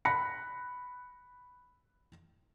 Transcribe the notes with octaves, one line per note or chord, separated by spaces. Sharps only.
B5 F#6 A#6 C#7